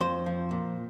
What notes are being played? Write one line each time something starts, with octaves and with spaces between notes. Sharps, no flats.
F2 C5
F3
A#2